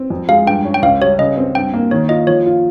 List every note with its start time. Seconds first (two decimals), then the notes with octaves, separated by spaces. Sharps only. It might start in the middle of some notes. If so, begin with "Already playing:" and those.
Already playing: C4
0.10 F2
0.29 G#3 F5
0.46 G2 G5
0.65 C#4
0.74 G5
0.82 C#2 F5
1.01 G3 C#5
1.19 C#3 D#5
1.37 C4
1.55 G2 G5
1.74 A#3
1.91 D#3 C#5
2.09 F4 D#5
2.27 F3 C#5
2.46 F4